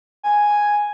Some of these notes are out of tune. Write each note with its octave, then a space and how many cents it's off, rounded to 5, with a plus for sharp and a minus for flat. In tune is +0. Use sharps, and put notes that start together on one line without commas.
G#5 +0